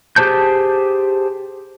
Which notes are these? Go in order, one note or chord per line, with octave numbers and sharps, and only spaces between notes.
G4 G#4 C5 A5 G6